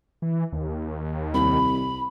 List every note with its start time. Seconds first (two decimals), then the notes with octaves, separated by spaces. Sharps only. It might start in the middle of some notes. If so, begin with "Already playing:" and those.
0.22 E3
0.52 D#2
1.34 C2 B5